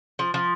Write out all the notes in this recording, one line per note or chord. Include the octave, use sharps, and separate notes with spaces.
F3
F3